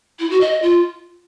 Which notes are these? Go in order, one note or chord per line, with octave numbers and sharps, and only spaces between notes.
E4
F#4
D#5
D#5
F4